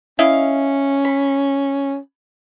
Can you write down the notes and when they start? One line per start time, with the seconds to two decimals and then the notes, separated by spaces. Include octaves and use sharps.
0.19 C#4 E4 D#5 F5
1.05 B5